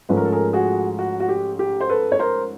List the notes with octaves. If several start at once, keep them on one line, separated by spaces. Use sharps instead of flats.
G#2 F3 A3 C#4 B4
A#4
A4
G#4 A#4
F#4 G#4
F#4
F#4
G4
G4
C5
A4 B4
C#5
A#4 C5